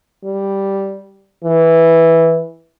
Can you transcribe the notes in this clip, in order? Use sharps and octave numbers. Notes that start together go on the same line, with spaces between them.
G3
E3